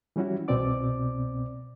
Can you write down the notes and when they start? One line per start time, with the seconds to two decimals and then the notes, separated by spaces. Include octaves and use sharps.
0.16 E3 G3 C#4 E4 F#4
0.48 C2 B2 B3 C4 D5 D6